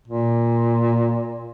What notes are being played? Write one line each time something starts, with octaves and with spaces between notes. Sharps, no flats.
A#2